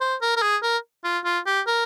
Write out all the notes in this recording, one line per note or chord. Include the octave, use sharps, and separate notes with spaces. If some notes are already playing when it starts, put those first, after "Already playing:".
C5
A#4
A#4
G#4
A#4
F4
F4
G4
A#4